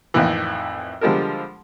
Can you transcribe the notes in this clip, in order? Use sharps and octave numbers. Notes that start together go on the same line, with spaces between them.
F2 A2 D#3 E3
D3 F3 G3 G#3 A4 A#4